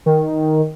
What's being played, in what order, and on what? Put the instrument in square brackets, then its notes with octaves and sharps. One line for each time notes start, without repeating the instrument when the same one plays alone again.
[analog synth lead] D#3